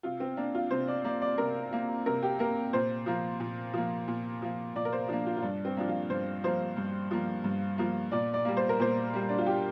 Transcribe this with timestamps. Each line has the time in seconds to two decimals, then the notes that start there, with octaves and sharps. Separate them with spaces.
0.03 C3 F4
0.20 C4
0.37 A#3 D4
0.55 F4
0.71 C3 C5
0.88 D5
1.04 A#3 D5
1.22 D5
1.38 C3 A#4
1.72 A#3
2.06 C3 A#4
2.23 G4
2.39 A#3 A#4
2.73 A#2 C5
3.06 F3 A#3
3.40 A#2
3.74 F3 A#3
4.08 A#2
4.42 F3 A#3
4.76 A#2 D5
4.85 A#4
4.93 C5
5.08 F3 A#3 D4
5.26 F4
5.37 F4
5.42 G2 D4
5.65 C4
5.77 F3 A#3 D4
5.88 F4
6.10 G2 C5
6.44 F3 A#3 C5
6.77 G2
7.11 F3 A#3
7.44 G2
7.78 F3 A#3
8.12 A#2 D5
8.34 D5
8.45 G3 A#3
8.57 C5
8.69 A#4
8.79 A#2 C5
9.13 G3 A#3
9.29 D4
9.38 F4
9.46 A#2 G4